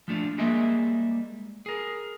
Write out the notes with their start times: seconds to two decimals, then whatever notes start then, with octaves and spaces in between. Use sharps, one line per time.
0.08 F3 A3 D4 F4
0.38 G3 G#3 A#3 G#4 D#5 E5
1.66 G#4 A#4